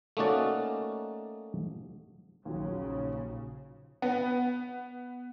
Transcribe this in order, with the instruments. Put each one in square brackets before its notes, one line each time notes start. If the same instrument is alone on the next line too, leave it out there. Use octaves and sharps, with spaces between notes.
[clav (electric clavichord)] A3 A#3 C#4 D#4 F#4 D5
[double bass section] A#1 C#3 [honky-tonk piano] D#2 F#3
[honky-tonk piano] B3